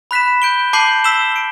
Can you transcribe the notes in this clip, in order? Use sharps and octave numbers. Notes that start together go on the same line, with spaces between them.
B5 F#6 B6 E7
G6 D7 G7
A5 D6 G6 C7 F#7
E6 B6 E7 G7
D7